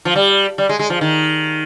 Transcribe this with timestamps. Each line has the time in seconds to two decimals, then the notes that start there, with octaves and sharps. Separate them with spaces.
0.05 F3
0.15 G3
0.58 G3
0.69 G#3
0.79 G#3
0.90 F3
1.01 D#3